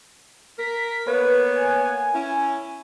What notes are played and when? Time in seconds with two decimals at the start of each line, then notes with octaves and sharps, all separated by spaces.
0.59 A#4 B6
1.07 A#3 B3 B4 C#5
1.55 G#5
2.14 C#4 E4